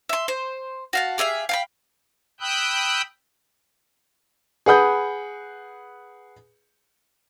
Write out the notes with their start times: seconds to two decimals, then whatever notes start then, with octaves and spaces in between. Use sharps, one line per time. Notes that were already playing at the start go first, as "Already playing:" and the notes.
0.09 E5 C6
0.28 C5
0.93 F#4 F5 A5
1.18 G4 G#4 E5 F5
1.49 F5 G5 B5
2.40 G5 B5 D#6 E6 F#6 G6
4.66 G#4 B4 F#5 B5 D#6 G6